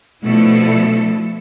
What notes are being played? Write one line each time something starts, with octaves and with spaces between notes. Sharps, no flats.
B2 F3 A3 D4 E4 A4